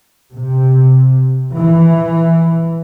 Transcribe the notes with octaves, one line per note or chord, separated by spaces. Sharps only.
C3
E3